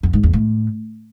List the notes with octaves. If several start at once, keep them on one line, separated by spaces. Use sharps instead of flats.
F2
G#2
E2
A2